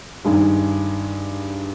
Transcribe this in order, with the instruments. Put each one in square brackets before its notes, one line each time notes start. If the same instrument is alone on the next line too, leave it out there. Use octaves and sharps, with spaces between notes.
[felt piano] G2 D#3 G#3 D#4